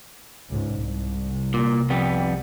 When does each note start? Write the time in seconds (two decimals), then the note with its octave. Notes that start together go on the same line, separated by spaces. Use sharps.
0.50 C#2 G#2
0.79 C2
1.54 A#2
1.90 F2 G3 B3